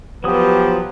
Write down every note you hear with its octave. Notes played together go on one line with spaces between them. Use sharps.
F3 F#3 B3 G4 B4 D#6